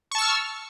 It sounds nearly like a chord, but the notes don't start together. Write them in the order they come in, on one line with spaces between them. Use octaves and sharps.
C#6 A5 E6 F6